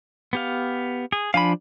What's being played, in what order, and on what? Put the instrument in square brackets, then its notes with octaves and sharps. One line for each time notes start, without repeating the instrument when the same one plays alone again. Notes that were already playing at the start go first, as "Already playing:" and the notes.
[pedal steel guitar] B3 G4 F5
G#4
[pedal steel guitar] F3 D4 [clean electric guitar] F5 G#5 B5